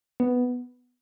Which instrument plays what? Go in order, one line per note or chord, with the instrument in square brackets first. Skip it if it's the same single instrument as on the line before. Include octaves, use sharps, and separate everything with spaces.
[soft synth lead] B3